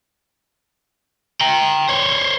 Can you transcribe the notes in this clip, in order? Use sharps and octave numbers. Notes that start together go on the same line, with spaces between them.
G5 A#5
C5 C#5